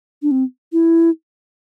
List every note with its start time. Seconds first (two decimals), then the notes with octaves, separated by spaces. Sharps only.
0.22 D4
0.31 C4
0.73 E4